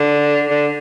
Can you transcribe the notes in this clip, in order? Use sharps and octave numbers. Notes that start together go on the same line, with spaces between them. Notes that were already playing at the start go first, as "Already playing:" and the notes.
Already playing: D3
D3